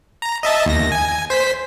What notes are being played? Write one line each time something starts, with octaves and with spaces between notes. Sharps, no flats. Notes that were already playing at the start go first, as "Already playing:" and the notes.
A#5
D#5 E5 A5
D#2 A#6
G#5
C5 B6